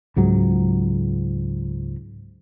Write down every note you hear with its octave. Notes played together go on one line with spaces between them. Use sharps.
C#2 G#2 F#3